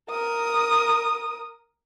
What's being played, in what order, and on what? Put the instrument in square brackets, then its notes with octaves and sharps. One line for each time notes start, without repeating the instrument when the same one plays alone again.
[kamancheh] A#4 D#6